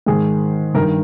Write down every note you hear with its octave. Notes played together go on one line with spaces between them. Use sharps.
G#2 D#3 G#4
G2 D#3 A#4